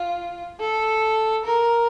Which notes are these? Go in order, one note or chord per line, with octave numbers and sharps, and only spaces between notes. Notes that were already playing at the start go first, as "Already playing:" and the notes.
Already playing: F4
A4
A#4